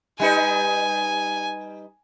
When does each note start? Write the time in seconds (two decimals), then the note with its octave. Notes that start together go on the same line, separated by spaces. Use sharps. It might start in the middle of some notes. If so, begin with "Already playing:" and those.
0.20 G3 D#4 B4 G#5